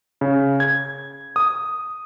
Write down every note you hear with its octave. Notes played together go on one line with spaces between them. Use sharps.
C#3
G#6
D#6